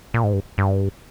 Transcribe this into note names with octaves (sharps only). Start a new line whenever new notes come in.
A#2
G#2
G2
G2